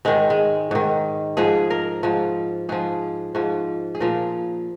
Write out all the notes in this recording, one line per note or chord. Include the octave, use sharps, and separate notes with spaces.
G#2 D#3 G#3
G#3
G#2 D#3
G#2 F3 G#4
A#4
G#2 F3
G#2 F3 G#4
G#2 F3
G#4
A#2 F3 A#4